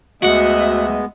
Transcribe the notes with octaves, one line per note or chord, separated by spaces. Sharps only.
D2 G#3 B3 F#4 D#5 E5 F#5